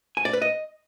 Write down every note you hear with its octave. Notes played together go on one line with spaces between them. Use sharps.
G#5
D5
B4
D#5